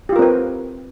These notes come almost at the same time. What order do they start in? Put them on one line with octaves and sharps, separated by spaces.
G4 F4 A#4 C4 B4